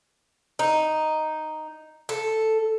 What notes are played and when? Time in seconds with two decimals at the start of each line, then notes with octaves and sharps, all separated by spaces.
0.59 D#4
2.09 A4